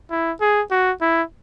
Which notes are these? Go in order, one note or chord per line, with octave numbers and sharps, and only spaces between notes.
E4
G#4
F#4
E4